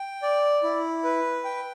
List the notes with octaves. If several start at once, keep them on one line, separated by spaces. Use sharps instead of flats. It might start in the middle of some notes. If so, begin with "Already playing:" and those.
Already playing: G5
D5
E4
B4
G5